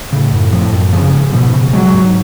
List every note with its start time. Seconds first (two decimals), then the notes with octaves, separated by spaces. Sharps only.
0.12 A2 C#3
0.32 F#2
0.53 A2 F3
0.72 F#2
0.93 C#3 F3
1.13 G#2
1.33 B2 F3
1.53 C#3
1.73 F#3 G#3
1.94 G#2